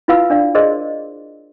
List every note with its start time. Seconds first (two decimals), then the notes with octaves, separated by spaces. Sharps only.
0.08 E4 F4 B4 F5 B5 E6
0.30 D4 D5 F5
0.55 G#4 A#4 C5 D5 D#5 C6